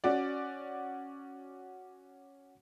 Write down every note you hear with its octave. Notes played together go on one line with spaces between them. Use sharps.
C#4 F#4 D5